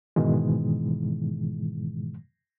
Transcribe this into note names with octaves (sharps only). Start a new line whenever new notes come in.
G#2 B2 D#3 E3 G#3